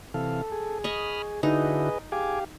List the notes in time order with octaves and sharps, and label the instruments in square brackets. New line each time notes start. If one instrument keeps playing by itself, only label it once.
[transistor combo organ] C3 E3 F5 [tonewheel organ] A4
[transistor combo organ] G#4
[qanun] D#5 C#6 [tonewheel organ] B5 D#6 F6
[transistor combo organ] D3 E4 F#4 [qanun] D#4 [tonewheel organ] G#4 B4 D#5
[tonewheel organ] G4 F5 [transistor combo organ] G#4 G#5 D6